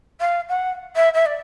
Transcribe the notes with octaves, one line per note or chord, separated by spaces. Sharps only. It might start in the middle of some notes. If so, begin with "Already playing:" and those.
F5
F#5
E5
E5
D5